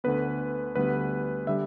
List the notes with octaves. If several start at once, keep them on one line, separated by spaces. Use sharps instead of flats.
D2 D3 B3 B4
D2 D3 G3 B3 B4
D3 G3 E5